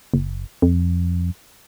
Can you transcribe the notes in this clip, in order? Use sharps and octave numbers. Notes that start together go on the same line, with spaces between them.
F#1
F2